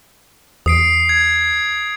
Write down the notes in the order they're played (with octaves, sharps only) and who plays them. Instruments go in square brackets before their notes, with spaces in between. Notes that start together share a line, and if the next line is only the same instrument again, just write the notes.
[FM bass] E2 [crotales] D#6 C7 D7
[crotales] G#6